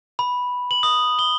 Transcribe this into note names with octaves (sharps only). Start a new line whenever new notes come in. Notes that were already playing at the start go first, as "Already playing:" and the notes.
B5
F#7
D#6
G7